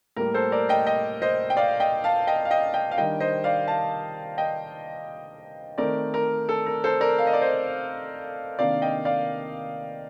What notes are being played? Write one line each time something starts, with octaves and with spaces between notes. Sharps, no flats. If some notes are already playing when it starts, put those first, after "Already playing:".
A2 G3 A#3 A#4
A4 C5
A#4 D5
D#5 G5
D#5 G5
C5 D#5
G5
D5 F5
D#5 G5
F5 A5
D#5 G5
F5
D#5 G5
D#5 G5
F5
D#3 G3 D4 D#5 G5
C5 D#5
D5 F5
F5 A5
D#5 G5
D#3 A3 C4 A#4 D5
A#4
A4
A#4
A4 C5
A#4 D5
F5
D#5
D5
C5 D#5
C3 D#3 A#3 D4 D5 F5
D#5 G5
D5 F5